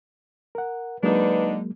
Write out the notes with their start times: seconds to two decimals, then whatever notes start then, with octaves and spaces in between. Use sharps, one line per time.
0.55 A#4 F#5
1.03 D3 F#3 G#3 A#3 D4 D#4 B4